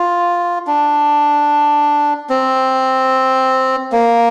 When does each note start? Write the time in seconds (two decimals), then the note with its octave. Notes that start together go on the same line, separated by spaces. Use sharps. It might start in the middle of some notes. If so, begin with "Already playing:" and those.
Already playing: F4
0.67 D4
2.29 C4
3.92 A#3